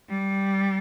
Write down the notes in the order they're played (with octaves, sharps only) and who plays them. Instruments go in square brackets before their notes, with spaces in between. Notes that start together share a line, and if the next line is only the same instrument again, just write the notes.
[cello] G3